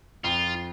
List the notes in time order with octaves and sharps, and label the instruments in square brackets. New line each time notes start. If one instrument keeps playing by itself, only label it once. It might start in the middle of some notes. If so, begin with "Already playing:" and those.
[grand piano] F2 [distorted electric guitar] F4